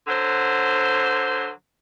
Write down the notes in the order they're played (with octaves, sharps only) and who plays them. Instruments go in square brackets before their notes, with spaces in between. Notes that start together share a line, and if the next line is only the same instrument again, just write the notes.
[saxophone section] D3 F#3 C5